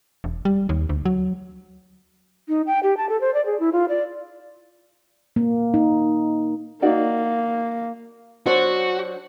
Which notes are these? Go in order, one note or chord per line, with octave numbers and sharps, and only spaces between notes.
E1
G3
D#2
D2
F#3
D#4
G5
G4
A5
A4
C5
D5
G#4
E4
F4
D5
A#3
D#4
A#3 D#4 F#4 D5
F#3 D4 F#4 C5